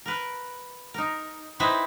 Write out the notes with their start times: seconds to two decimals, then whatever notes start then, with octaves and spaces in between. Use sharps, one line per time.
0.06 A#4 B4
0.94 D#4 A#4
1.60 C4 D#4 E4 B4 E5